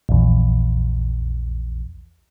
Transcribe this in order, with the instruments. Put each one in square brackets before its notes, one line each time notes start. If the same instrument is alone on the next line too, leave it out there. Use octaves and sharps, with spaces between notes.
[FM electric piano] A#1 E2